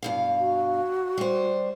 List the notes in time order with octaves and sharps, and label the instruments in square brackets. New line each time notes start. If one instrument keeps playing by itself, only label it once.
[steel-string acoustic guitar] G2 B2 F5
[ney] F#4
[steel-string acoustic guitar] G3 C5